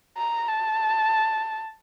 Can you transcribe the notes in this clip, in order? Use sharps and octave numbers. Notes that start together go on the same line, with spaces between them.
A#5
A5